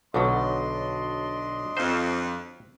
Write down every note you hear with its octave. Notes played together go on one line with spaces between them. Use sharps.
B1 B2 D3 F#3 D4 D#5 C6
F2 C5